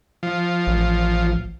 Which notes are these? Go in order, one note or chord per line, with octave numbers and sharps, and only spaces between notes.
F3
A1